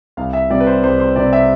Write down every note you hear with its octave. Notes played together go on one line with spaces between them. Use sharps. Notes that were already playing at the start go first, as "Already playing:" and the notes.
C2 F5
E5
C3 G3 C4 D5
B4
C5
C2 C5
C5
C3 G3 C4 D5
E5